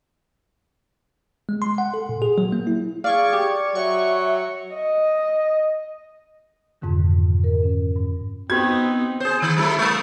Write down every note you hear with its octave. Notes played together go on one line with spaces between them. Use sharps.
G#3
C6
F#5
A4
A#2
G#4
F#3
A#3
E4
G#4 D5 F5 C#6 G#6
G4
F#3 E5 C#6
D#5
F2 G#2 B2 D3 D#3
A#4
C#4
G2
B3 C4 D#4 F#4 G4 G#6
G#4 C5
D#3
F#3 A3 E4
G#3 A#3